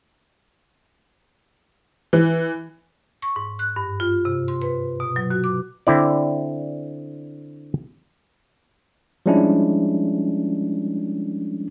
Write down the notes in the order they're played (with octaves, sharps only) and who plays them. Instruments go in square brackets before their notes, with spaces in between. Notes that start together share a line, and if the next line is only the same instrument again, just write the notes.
[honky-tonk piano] E3
[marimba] C#6
G#2
F#6
G2
F4
C3
C6
B4
B2
F#3
F#4
D6
[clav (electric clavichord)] D3 C4 E4 D5
[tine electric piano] F3 G3 G#3 C#4 D4 E4